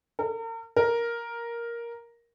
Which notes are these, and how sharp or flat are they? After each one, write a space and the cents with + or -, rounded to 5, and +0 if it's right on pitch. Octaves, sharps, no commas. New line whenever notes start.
A#4 -40
A#4 +5